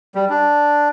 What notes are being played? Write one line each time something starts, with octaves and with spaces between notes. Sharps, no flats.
G3
D4